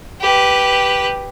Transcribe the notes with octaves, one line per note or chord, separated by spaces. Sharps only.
G4 B4